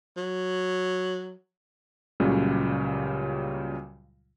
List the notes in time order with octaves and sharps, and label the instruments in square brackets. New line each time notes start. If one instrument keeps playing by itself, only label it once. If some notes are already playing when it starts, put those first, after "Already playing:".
[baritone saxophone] F#3
[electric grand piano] C#2 A#2 C#3 F#3 G3